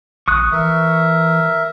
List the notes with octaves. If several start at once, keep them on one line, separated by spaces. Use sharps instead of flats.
A#1 C#6 D#6 F#6
E3 A#4 E5